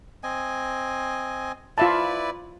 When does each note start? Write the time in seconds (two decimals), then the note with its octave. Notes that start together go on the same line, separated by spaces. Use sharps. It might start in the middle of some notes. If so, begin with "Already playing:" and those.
0.23 C4 D#5 G#5
1.78 E4 F4 B4 D5 E5 A5